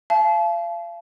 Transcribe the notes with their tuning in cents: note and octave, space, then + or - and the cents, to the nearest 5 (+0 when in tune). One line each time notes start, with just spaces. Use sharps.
F5 -35 A5 -35